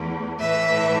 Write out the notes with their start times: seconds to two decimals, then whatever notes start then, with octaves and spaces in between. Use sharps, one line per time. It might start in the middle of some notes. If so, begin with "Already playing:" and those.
Already playing: E2 E3 A3 B4
0.40 A2 E3 A3 B4 E5